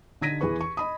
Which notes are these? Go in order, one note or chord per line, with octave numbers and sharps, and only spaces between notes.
D3 D#4 G#6 A#6 B6 D#7
E2 E3 G#4 B4 C#6
C#6
D#5 B5 D#6